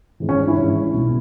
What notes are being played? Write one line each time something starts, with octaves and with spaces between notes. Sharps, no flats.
G#1 G#2 E3
C#4
D4
E4
G#1 G#2 E3
B1 B2